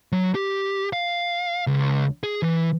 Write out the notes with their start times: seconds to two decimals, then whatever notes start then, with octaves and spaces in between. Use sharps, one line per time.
0.12 F#3
0.35 G4
0.93 F5
1.67 C#2
2.23 G#4
2.43 E3